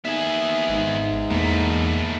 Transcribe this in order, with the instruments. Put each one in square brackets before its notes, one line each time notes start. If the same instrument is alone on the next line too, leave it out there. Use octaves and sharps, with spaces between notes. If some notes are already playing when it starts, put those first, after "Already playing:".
[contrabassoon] D#2 [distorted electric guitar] B3 G#4 [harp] E5 G#5
[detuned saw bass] G#1 [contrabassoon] G#2
[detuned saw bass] E2 [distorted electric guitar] B2 A3 [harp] A#3